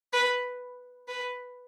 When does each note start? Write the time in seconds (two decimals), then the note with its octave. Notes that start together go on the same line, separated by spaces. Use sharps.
0.13 B4
1.08 B4